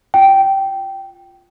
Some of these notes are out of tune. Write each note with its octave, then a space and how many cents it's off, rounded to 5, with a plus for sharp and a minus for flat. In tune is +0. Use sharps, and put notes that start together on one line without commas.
F4 +0 G5 -10